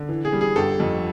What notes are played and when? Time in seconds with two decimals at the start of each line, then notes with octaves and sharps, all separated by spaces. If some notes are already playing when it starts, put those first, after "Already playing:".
Already playing: D3
0.09 E3
0.25 G#4
0.32 G3
0.41 G#4
0.56 G1 G4 A4
0.80 F2